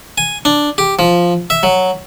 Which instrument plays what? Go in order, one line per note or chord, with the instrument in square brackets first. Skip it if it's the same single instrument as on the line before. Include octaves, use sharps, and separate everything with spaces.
[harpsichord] G#5
D4
G4
F3
E5
F#3